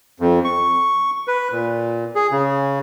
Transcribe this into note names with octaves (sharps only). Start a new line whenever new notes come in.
F2
C#6
B4
A#2
G#4
C#3